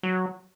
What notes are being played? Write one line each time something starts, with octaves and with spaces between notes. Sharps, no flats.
F#3